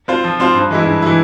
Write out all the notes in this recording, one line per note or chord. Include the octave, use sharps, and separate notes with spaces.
C4 F4 C5 F5
F3
C4 F4 C5 F5
G2
E3 G#3 E4
G2
E3 G#3 E4